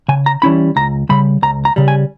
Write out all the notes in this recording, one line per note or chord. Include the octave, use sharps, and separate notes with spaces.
C#3 G#5
A#5
E3 G3 C#4 E4 B5
C#2 A#5
C#3 G3 B5
C#2 A#5
A#5
C#3 G3
G#5